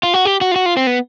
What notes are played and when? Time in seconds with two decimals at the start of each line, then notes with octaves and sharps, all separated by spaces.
0.03 F4
0.14 F#4
0.25 G4
0.41 F#4
0.52 F4
0.56 F#4
0.66 F4
0.77 C4
0.87 B3